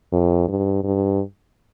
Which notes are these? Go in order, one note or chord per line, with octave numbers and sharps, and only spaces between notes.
F2
G2
G2